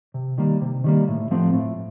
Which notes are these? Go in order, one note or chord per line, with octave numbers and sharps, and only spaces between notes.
C3
D#3 G3 A#3
C3
D#3 G3 A#3
A2
F3 A3 C4
A2